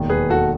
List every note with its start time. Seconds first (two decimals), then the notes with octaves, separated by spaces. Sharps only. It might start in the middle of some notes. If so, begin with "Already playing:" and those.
Already playing: E1 D#2 D#3
0.10 G#4 B4
0.30 F#4 A4